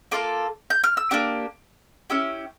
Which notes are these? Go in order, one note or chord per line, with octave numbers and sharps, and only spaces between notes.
A#3 C#4 F4 A4 D6
G6
F6
E6
A#3 D4 G4 D6
C#4 E4 G4 E6